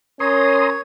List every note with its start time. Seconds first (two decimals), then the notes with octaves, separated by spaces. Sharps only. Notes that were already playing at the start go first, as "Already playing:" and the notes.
0.20 C#4 A#4 C#5 A#5 C6 D#6